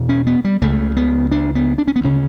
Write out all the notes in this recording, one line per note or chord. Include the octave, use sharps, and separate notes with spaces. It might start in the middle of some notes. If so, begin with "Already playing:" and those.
Already playing: E2 B2
C#4
B3
G3
C#2 C#3 A3
B3
D4
B3
D4
C#4
B3
D2 C#3 C#4